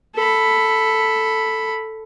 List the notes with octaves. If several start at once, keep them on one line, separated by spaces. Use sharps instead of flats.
A4 B5